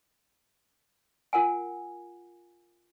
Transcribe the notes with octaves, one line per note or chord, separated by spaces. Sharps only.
F4 A#4 F#5 G#5